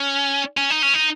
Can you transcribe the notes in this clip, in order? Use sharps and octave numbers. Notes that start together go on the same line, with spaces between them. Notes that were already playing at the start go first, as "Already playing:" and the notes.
Already playing: C#4
C#4
D#4
C#4
D#4